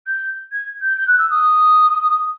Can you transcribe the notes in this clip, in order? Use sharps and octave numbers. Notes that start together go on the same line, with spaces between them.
G6
G#6
G6
G6
F#6
E6
D#6